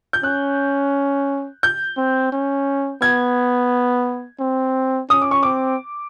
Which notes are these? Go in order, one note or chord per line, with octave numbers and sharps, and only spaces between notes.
G6
C#4 F#6
G6
C4
C#4
B3 G#6
C4
C#4 D#6
D6
C#6
C4 D6